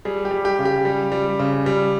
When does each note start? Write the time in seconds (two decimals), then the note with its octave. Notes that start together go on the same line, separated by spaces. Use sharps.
0.05 G3 G#4
0.25 G4
0.31 G3
0.45 G4
0.59 C#3
0.65 G4
0.85 G3
1.12 G3
1.40 C#3
1.66 G3